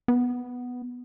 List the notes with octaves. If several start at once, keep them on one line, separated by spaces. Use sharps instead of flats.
B3